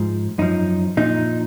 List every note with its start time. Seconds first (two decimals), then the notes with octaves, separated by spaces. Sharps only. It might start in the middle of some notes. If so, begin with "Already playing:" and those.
Already playing: G#2 F3
0.38 F#2 F3 D#4
0.97 A#2 F3 D#4